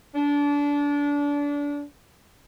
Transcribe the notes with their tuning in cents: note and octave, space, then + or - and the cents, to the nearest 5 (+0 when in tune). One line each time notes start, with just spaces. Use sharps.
D4 -25